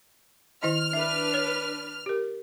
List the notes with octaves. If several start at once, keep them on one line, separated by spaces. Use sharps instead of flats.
D#3 E4 D#5 F6
D4 B4 E5
C#5
G4 A#4